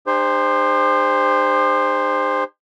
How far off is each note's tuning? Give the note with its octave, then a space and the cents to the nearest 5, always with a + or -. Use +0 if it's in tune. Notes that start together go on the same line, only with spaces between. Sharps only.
D4 +45 G4 +45 C5 +0